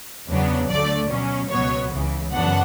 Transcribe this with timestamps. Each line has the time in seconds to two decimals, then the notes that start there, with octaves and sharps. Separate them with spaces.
0.28 E2 C#3 F#3 B3 D4
0.69 D2 D3 A3 D5
1.10 B2 F#3 C#4
1.50 C#2 B2 F#3 B3 C#5
1.91 C#2 C#3 E3
2.32 F#2 C#3 E3 B3 D4 F#5